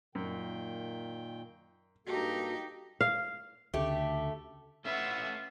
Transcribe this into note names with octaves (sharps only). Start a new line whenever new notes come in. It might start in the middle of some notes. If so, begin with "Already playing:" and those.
F#2 A#2 D#3 G5
G2 A#3 D#4 F#4 G4 A4
F5
D2 C#3 A3 G4
A3 C#4 F4 B4 E5 F#5